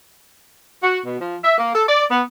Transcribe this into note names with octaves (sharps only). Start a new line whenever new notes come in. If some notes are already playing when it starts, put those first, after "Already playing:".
F#4
B2
F3
E5
A#3
A4
D5
B3